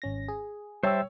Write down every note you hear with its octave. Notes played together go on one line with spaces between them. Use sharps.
G#1 C#4 A#6
G#4
G3 C5 C#5 E5 G5 A5 E6